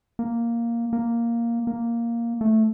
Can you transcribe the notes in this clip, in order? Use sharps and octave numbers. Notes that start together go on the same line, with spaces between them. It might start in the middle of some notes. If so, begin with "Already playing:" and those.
A#3
A#3
A#3
A3